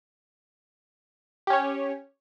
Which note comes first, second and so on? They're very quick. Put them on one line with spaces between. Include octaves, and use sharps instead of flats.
G4 C#4 C#5